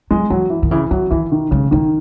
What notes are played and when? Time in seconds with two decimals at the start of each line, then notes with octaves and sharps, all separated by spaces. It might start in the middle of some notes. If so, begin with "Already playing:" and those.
0.11 F#3 G#3
0.30 E3 F#3
0.50 E3
0.63 D#3
0.71 C#3 E3
0.91 D#3 F#3
1.11 D#3 E3
1.32 D#3
1.51 C#3 G#3
1.71 D#3 A#3